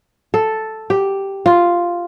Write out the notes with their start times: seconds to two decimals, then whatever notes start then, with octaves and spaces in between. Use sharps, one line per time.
0.34 A4
0.90 G4
1.46 F4